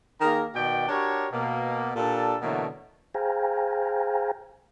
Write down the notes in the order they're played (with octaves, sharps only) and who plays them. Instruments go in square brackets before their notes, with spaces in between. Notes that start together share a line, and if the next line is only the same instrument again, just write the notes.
[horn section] D#3 A#3 G#4 A#4 A#5
B2 D#3 F#4 D5 G5
D4 F#4 G4 A#4 C#5
B2 A#3
A#2 D4 G4 A4
B2 D3 E3 F#3 A3 A#3
[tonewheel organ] G#4 C5 F5 G5 G#5 A#5